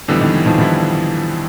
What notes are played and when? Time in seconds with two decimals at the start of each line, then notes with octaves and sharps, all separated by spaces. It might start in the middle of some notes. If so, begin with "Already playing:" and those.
0.08 F2 D3 E3 G3 B3 E4
0.21 D#3
0.34 E3
0.46 D#3 F3
0.58 D3 D#3 G3 B3 E4